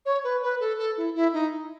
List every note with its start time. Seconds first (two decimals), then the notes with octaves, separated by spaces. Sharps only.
0.06 C#5
0.24 B4
0.42 B4
0.60 A4
0.78 A4
0.97 E4
1.15 E4
1.33 D#4